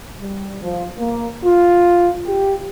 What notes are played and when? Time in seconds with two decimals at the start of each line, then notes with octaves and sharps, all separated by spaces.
0.19 G3
0.62 F3
0.97 A#3
1.44 F4
2.26 G4